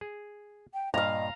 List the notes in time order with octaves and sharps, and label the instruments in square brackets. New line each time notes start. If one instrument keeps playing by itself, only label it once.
[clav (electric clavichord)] G#4
[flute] G5
[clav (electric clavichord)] G2 A#2 [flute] D#5 [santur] F5 A#5